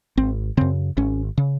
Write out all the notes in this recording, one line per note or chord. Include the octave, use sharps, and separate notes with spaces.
G#1 C4
F#2 C#3 C4
G#1 C#4
C#3